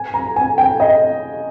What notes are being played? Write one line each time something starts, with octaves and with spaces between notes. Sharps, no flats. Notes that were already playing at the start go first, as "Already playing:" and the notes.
Already playing: G#5
A#5
G#5
G5
D#5